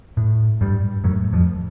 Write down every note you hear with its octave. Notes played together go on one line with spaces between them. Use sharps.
A2
G2 G3
F#2 A2 F#3
F2 F3